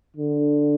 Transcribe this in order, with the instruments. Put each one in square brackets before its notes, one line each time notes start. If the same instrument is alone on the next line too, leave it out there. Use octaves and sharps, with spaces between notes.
[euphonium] D3